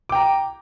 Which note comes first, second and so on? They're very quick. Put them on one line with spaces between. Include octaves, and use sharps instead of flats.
D6 G5 A#5